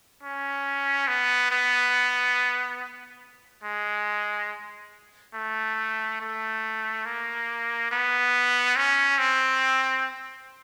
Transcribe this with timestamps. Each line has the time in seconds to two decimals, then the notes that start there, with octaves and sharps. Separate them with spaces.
0.23 C#4
1.08 B3
1.51 B3
3.63 G#3
5.34 A3
6.21 A3
7.05 A#3
7.91 B3
8.76 C#4
9.19 C4